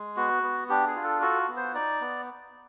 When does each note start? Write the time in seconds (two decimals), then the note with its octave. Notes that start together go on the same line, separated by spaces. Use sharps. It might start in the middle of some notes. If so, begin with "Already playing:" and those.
Already playing: G#3
0.17 B3 F#4
0.43 B3
0.69 D4 G4
0.87 G#4
0.95 F4
1.04 A4
1.22 F#4 A4
1.48 B3
1.57 C5
1.74 D#4 D5
2.01 B3